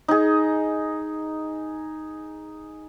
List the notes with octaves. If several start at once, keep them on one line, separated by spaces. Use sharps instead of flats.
D#4 G#4